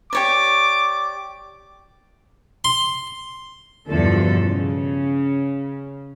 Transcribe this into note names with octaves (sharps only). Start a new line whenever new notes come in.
G4 C#5 D5 D6
C6
E2 G2 B2 D3 F3 A4
C#3